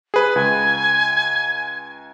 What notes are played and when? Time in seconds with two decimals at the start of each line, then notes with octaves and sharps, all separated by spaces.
0.14 G#4 B4
0.36 C#2 G#5